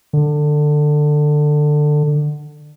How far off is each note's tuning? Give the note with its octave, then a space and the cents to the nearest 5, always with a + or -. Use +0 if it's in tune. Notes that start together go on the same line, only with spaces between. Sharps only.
D3 +20